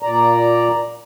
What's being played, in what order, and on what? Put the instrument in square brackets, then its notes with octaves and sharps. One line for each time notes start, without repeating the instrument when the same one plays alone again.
[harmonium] A#2 D5 A#5